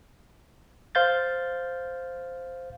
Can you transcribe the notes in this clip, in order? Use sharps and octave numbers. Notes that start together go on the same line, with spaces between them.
C5 F5 G6 A6